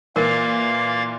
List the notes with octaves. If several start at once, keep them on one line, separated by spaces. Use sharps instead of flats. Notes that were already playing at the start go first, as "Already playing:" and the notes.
A#2 E3 A#3 A#4 C5 F5 A6